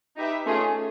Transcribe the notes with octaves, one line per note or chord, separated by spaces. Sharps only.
D#4 G4 B4 E5
A3 C#4 F4 G#4